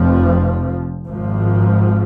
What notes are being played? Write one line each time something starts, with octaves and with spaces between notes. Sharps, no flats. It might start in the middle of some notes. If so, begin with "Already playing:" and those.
Already playing: F1 F2 F3
G#1 G#2 F3